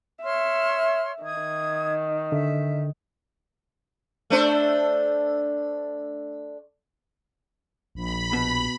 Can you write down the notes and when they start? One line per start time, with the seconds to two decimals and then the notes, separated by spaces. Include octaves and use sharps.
0.23 C#5 E5 C6 F6
1.23 D#3 D#6 G#6
2.32 D3 E5
4.30 A3 D4 C5
7.95 A#1 B5
8.33 B2